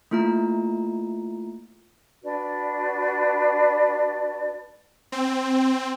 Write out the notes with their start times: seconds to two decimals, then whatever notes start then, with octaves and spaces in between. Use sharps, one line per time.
0.11 A3 A#3 E4 F4 A#5
2.23 D4 F#4 B4 D5
5.12 C4